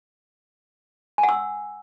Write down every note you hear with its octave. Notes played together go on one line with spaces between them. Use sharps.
G#5
F#5
E6